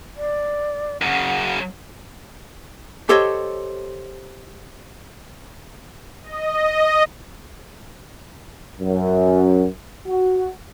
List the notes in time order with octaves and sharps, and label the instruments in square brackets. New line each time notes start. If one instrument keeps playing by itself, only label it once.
[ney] D5
[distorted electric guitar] F#2 C#3 [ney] F#5
[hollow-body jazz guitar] G4 A4 C5 C#5 D#5
[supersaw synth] D#5
[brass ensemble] F#2
F#4